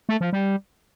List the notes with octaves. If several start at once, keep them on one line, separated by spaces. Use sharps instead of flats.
A3
F3
G3